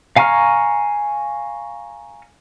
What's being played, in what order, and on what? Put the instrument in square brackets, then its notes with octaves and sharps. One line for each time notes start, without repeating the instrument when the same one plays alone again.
[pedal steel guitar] F5 G#5 A#5 C#6 F6